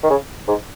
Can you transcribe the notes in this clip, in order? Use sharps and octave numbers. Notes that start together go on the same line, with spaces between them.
D#3
C#3
G#2